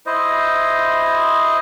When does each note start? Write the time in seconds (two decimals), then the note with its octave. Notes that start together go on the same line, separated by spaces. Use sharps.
0.06 E4 C5 D#5